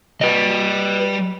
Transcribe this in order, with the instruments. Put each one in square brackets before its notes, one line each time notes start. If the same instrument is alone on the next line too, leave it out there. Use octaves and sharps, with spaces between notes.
[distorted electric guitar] G3 [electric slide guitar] B4 D#5